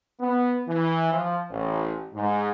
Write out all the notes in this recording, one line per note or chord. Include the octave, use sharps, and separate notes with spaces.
B3
E3
F3
A1
G#2